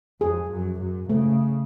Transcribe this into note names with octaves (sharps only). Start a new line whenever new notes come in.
F2 G#4
F#2
F#2
C#3 A3